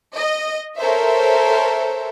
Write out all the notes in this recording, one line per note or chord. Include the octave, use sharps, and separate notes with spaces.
D#5
A4 A#4 C5 C#5 E5